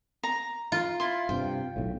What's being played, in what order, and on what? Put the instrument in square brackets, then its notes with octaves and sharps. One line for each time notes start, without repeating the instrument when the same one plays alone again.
[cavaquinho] A#5
[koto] F4
[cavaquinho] E4 C6
[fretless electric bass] G2 C3 [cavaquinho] G5
[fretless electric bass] B1 A2